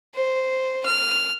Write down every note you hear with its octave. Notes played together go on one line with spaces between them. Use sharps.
C5
F6